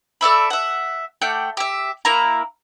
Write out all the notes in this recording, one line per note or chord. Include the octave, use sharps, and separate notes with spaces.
A4 D5 E5 B5
E5 F#5
A3 F#5 G5 D6
G4 E5
A#3 E4 A#5